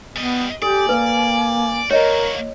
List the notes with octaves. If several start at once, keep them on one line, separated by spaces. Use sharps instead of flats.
G3 B3 D#5
G4 A4 D5 G#5
A#3 B4
A#3 F#4 A#4 C#5 D#5